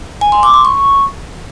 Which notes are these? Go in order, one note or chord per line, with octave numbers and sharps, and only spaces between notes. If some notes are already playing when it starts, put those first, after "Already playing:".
G#5
C6
D6
C6
C#6